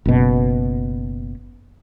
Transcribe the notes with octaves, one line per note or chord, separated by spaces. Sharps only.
F#1 B2